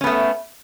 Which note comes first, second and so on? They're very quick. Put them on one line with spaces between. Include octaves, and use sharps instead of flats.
C#4 B3 A3